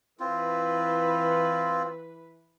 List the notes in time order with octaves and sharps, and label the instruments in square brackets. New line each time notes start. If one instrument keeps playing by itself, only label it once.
[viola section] E3 B4 [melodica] C4 F4